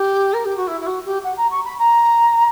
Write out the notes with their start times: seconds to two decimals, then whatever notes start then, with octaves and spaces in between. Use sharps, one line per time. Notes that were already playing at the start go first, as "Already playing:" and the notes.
Already playing: G4
0.33 A#4
0.45 G4
0.57 F#4
0.67 E4
0.81 E4
0.86 F#4
1.05 G4
1.23 F#5
1.37 A#5
1.50 C#6
1.65 B5
1.79 A#5